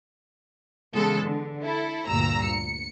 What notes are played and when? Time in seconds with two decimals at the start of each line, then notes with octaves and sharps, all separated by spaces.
0.93 C#3 E3 G#3 B3 A4
1.26 D3
1.64 E4 A4
2.08 D2 G2 A#2 A#5 E6 A#6
2.45 C#7